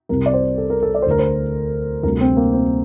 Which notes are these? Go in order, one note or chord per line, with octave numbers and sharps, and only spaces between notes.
C2 C3 G3 A#4
D5
C5
A4
A#4
A4
D5
C5
D2 D3 A3 A#4
C5
D2 C3 G3 A#4
C4
A#3
C4